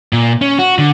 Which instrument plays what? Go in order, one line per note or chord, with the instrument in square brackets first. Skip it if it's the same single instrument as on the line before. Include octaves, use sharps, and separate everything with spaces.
[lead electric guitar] A#2
C#4
F#4
D3